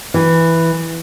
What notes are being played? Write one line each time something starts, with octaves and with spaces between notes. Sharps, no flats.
E3